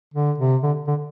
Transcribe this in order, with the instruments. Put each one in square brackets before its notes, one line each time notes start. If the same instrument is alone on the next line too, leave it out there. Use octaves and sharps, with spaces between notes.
[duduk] D3
C3
D3
D3